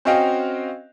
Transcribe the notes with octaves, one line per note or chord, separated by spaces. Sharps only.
C4 C#4 F#4 D#5 F5 G5